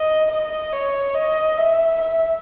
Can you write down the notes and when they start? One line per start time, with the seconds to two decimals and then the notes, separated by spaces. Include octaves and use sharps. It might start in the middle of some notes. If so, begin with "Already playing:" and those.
Already playing: D#5
0.31 D#5
0.72 C#5
1.14 D#5
1.57 E5
2.00 E5